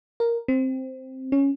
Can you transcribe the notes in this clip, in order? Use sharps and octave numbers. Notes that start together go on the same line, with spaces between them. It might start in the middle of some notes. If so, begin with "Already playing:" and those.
A#4
C4
C#4